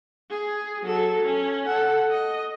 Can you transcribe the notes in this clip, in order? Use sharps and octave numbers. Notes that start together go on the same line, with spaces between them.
G#4
F#3 A4
C#4
A4 F#5
D#5